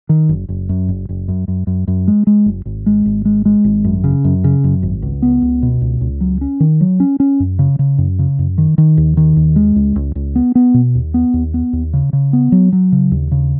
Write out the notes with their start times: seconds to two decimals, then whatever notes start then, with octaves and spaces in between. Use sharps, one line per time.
0.09 D#3
0.29 F#1
0.49 F#1
0.69 F#2
0.88 F#1
1.09 F#1
1.28 F#2
1.48 F#2
1.67 F#2
1.88 F#2
2.08 G#3
2.27 G#3
2.46 F#1
2.66 G#1
2.86 G#3
3.06 G#1
3.25 G#3
3.45 G#3
3.64 G#1
3.84 F#2
4.04 C#3
4.24 F#2
4.44 C#3
4.64 F#2
4.83 G#1
5.02 C#2
5.22 B3
5.42 C#2
5.63 B2
5.81 C#2
6.01 C#2
6.21 F#3
6.41 C#4
6.60 D#3
6.81 F#3
7.00 C#4
7.20 C#4
7.40 F#2
7.59 C#3
7.79 C#3
7.98 F#2
8.19 C#3
8.39 F#2
8.58 D#3
8.78 D#3
8.97 D#2
9.17 D#3
9.36 D#2
9.56 G#3
9.76 C#2
9.96 C#2
10.15 C#2
10.35 B3
10.55 B3
10.74 B2
10.95 D#2
11.14 B3
11.34 D#2
11.54 B3
11.73 D#2
11.93 C#3
12.13 C#3
12.33 B3
12.52 F#3
12.72 F#3
12.92 C#3
13.11 D#2
13.31 C#3